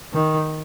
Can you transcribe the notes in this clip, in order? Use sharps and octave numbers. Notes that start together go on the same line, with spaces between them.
D#3